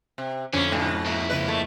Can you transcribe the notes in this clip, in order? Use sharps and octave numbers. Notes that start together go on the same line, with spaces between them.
C3
F2 D3 A3 C#4 D6 C7
G#2 B2
A#3 E4
C#2 C#3 B4 D#5
A3 C#6 G#6